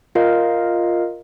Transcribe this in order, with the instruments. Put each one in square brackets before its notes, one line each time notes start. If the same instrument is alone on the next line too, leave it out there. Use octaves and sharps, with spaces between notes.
[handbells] F4 A#4 D#5 F5